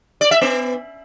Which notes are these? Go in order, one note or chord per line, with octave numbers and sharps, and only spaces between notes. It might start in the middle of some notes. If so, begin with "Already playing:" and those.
D5
E5
B3